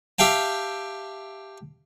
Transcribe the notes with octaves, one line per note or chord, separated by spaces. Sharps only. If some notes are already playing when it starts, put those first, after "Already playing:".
G4 E5 F5 G5 A5